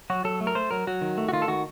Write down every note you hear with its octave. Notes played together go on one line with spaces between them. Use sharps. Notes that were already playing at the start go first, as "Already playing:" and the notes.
F#3 F#4
F#3 A4
A3
A#4
A3 C5
F#3 A#4
F#3 F#4
D#3
A3
F#4
D#3 F4
A4
D#3 F#4